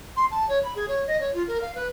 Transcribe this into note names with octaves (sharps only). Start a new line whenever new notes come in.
C6
A5
C#5
B5
G#4
C#5
D#5
C#5
F4
A#4
F5
B4